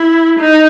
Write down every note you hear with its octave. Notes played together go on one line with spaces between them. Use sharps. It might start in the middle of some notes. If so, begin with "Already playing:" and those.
Already playing: E4
D#4